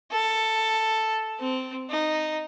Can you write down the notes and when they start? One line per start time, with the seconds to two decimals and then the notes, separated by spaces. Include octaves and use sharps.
0.11 A4
1.40 C4
1.90 D#4